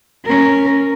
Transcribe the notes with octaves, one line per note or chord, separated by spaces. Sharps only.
C#4 A#4